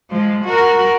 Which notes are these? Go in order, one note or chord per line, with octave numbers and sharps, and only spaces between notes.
F3 G#3
F#4 A#4